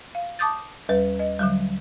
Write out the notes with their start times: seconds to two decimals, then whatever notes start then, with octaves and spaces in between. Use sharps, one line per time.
0.15 F5
0.39 A5 D6 D#6 G6 A6
0.89 D#2 G3 B4
1.19 D#5
1.39 D3 F#3 G3